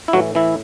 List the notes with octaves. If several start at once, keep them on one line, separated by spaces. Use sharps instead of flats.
E4
A2 E3 F#3 F#4
E3 E4